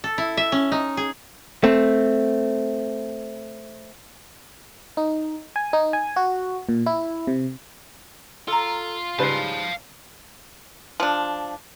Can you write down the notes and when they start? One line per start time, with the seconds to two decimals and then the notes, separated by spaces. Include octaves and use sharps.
0.04 A4
0.18 E4
0.37 E5
0.52 C#4
0.72 D#4
0.97 G#4
1.64 A3 C4
4.97 D#4
5.56 G#5
5.73 D#4
5.93 G#5
6.16 F#4
6.69 A#2
6.86 E4
7.27 C3
8.48 F4 A4 A#5
9.19 G#2 C#3 G3 B4 F5 A5
11.00 F3 D4